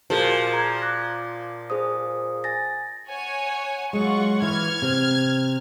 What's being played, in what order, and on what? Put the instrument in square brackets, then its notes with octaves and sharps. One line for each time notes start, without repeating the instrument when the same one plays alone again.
[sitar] A#2 F3 [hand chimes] F#4 G#4 A#4
[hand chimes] A#5 G#6
D6 F#6 A#6
G#4 C5 D#6
G#5 A6 A#6
[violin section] C#5 F#5 G#5
[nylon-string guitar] F#3 G#3 [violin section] F4 F#5 C#6
[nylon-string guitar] E3 [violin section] F6 G#6
[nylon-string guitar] C3